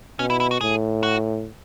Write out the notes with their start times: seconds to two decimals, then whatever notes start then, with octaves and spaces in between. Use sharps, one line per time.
0.19 B2 C#4
0.30 E4
0.40 E4
0.51 F#4
0.61 A2 G#4
1.03 F#4